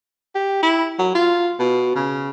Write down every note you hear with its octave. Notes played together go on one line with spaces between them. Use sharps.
G4
E4
F#3
F4
B2
C#3